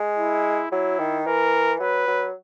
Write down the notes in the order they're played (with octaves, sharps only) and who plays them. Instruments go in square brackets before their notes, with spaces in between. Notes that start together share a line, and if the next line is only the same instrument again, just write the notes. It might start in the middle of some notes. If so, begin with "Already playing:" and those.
Already playing: [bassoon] G#3
[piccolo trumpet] E4
[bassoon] F#3 [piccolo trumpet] E4
[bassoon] D#3
[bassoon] E3 [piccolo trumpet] A#4
[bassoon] F#3 [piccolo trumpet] B4
[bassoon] F#3